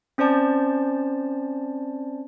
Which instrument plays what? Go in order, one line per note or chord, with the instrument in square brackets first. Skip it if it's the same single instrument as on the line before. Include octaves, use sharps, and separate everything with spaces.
[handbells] C4 C#4 C5 D5 A5